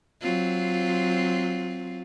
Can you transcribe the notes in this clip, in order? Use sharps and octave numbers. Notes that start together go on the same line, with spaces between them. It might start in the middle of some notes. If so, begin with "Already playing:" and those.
F#3 C4 F4